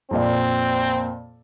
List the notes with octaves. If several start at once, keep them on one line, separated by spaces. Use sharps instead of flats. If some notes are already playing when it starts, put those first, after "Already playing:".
F2 A#2 C4 D5